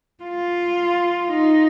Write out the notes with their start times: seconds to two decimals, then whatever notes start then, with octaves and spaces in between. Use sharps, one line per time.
0.24 F4
1.30 D#4